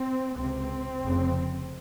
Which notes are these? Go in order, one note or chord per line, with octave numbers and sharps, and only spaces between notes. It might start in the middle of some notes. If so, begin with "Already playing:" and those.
Already playing: C4
C#2 C3 C4
F1 F2 C#3